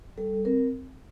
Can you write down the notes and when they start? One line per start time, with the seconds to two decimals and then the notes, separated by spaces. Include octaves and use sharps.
0.18 G3 A4
0.45 C4 A#4